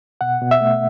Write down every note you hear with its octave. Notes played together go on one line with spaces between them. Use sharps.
B2 F#5
B2
E5
A3